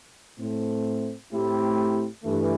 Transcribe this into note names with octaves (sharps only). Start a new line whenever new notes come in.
A2 A3 C4
A2 A3 C4 E4 G4
G2 E3 A3